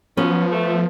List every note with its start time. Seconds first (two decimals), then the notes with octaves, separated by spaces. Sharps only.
0.17 F3 F#3 B3 C#4
0.52 A3